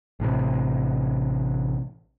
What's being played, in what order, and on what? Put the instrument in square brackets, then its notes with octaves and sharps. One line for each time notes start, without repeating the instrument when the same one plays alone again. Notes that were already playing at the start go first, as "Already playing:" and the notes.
[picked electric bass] A1 A2 C3